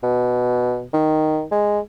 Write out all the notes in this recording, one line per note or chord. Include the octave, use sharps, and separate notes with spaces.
B2
D#3
G#3